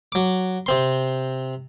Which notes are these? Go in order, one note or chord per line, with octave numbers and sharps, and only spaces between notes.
F#3 D6
C3 C4 C6